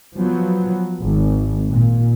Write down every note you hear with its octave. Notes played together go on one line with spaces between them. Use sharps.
F3 F#3 B3
G#1
A#2